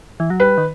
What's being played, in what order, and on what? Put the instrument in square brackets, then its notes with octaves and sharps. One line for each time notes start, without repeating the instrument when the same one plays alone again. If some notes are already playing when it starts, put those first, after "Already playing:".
[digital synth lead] E3
F#3
[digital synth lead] G3 [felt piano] B4
[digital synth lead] D#3